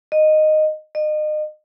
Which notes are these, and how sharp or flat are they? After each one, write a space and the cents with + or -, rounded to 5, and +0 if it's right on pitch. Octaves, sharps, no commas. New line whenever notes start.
D#5 -10
D#5 -35